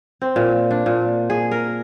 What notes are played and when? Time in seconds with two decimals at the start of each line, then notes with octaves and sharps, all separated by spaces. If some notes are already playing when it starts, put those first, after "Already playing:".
0.22 C4
0.36 A#2
0.71 D4
0.86 A#2
1.30 G#4
1.51 A#4